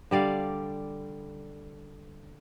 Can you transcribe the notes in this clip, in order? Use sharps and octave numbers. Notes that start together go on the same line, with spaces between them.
D3 G3 D5 F5